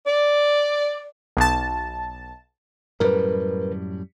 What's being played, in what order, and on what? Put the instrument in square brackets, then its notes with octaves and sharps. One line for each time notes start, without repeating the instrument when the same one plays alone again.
[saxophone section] D5
[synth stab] B1 A5
[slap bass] F#2 A2 G3 [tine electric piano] A#4 B4